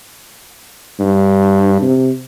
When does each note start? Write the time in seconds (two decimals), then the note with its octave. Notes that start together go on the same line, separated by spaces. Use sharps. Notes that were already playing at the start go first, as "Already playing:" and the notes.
0.99 G2
1.81 C3